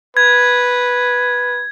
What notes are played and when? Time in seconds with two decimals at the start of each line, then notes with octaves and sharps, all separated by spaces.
0.17 B4 G#6